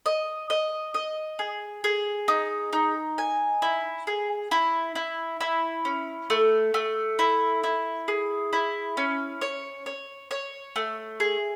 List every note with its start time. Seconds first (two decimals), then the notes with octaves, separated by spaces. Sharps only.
0.06 D#5
0.50 D#5
0.94 D#5
1.39 G#4
1.84 G#4
2.28 D#4
2.73 D#4
3.18 G#5
3.62 E4
4.07 G#4
4.51 E4
4.95 E4
5.41 E4
5.85 C#4
6.30 A3
6.74 A3
7.19 E4
7.64 E4
8.08 G#4
8.53 E4
8.97 C#4
9.41 C#5
9.86 C#5
10.31 C#5
10.76 A3
11.20 G#4